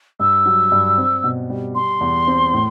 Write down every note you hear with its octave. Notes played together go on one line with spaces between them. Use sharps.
G2 E6
F#3
G2
C4
B2
G3
G3 C6
E2
C4
A2